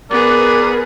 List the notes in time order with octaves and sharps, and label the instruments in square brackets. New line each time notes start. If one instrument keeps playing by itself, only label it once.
[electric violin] B3 G#4 [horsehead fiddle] A#4 B4 [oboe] D5